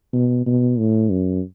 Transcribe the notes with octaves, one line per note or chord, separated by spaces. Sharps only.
B2
B2
A2
F#2